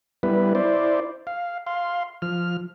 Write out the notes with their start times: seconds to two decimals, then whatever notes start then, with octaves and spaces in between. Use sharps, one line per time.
0.23 G3 B3 E4 B4
0.55 E4 C5 D5
1.27 F5
1.67 F5 C6
2.22 F3 F6